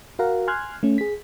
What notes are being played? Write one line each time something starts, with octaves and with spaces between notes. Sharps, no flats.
F#4 A#4 F5 F#5 A#5
G#5 C6 F6 F#6 G#6
A3 C#4
G#4 B6